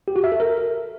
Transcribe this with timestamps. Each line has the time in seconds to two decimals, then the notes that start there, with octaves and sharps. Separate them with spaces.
0.08 G4
0.16 F#4
0.24 E5
0.32 A4
0.40 A#4